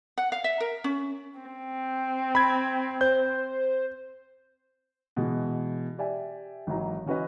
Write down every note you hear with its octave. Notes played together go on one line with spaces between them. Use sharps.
F#5
F5
E5
A#4
C#4
C4
B5 G#6
C5 G6
B2 E3 G#3
G4 D5 E5 G#5
G#1 E3 F#3 A#5
E3 C#4 F#4 B4 D#5